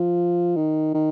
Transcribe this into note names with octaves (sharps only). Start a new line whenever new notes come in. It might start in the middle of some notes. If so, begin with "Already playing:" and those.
Already playing: F3
D#3
D#3